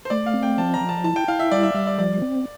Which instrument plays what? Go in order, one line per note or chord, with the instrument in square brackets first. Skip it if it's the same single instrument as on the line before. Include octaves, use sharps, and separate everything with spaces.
[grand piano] C5
[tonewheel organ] A3 [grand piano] D5
[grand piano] F5
[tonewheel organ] C4
[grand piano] G5
[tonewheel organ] F3 [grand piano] A5
[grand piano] A#5
[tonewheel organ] F3
[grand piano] A5
[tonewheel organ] E4 [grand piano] A5
[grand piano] G5
[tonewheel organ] E4 [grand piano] F5
[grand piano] E5
[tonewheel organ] G3 [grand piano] D5
[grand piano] E5
[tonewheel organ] G3 [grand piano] E5
[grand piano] D5
[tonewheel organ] F3 [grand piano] D5
[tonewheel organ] C4